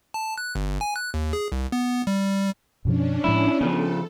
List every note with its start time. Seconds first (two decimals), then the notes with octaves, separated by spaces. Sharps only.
0.14 A5
0.38 F#6
0.55 G1
0.81 G#5
0.96 F#6
1.14 D#2
1.33 G#4
1.52 C2
1.72 B3
2.07 G3
2.85 F#2 B2 F3 C#4 D4
3.24 A2 F3 G#3 E4
3.61 C#3 E3 F3 B3 A4